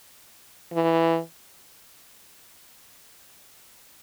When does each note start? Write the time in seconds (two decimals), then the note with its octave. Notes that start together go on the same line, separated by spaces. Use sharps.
0.73 E3